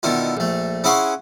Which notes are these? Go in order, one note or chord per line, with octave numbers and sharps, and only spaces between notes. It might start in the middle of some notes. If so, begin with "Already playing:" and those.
B2 D3 D#3 E4 F4
A#1 A3
C#4 E4 G#4 F#5 C6 C#6